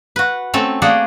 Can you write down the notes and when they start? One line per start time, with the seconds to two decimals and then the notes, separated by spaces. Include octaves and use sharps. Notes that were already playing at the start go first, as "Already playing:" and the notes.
0.16 F#4 B4
0.54 A3 C4 C#4 A4
0.82 A3 A#3 G#4 D5 F#5 G5